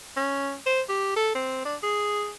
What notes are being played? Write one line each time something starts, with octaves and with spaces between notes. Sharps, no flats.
C#4
C5
G4
A4
C4
D4
G#4